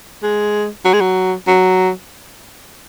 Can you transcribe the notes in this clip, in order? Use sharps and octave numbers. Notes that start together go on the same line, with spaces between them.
G#3
F#3
G#3
F#3
F#3